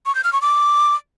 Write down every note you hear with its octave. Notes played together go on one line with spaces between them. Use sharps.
C#6
G6
F6
C#6
D6